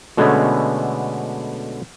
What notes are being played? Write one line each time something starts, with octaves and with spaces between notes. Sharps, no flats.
B2 D3 G#3 A3 B3 C#4